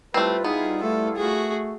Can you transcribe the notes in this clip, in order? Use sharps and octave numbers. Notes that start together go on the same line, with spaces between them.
G3 A3 C4 E4 F4 B4
B3 D#4 G#4
A3 A4
A3 F#4 G#4